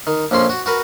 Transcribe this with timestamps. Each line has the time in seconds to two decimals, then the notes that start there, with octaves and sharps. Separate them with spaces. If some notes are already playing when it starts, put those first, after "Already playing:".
0.07 D#3
0.31 A#1 F2 C#4 C6
0.50 F#4
0.66 F#4 A#4 B4